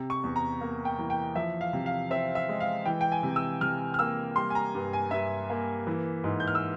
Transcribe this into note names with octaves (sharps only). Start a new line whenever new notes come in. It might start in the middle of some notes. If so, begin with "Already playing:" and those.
Already playing: C3
C#6
E2
A#5
A#3
G5
E3
G5
F3 E5
F5
C3
F5
C4 E5
E5
G#3
F5
E3 G5
G5
G#5
C3
E6
C3 F6
F6
A#3 E6
G3 C6
G#5
A#5
G2
G#5
G2 E5
A#3
E3
G#2
G6
F6
E6